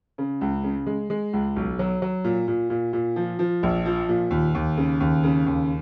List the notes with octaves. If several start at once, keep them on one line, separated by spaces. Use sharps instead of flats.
C#3
C#2
C#3
G#3
G#3
C#2
B1
F#3
F#3
A#2
A#2
A#2
A#2
F3
F3
A#1
F3
A#2
D#2
D#2
C#3
D#2
C#3
D#2